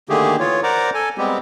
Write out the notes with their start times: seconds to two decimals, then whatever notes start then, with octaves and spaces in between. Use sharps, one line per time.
0.09 D3 D#3 A3 A#3 G4 G#4
0.40 E3 F4 C#5
0.63 A#4 C5 D5 F#5 A#5 D6
0.94 A4 G#5
1.18 G3 G#3 B3 C4 G4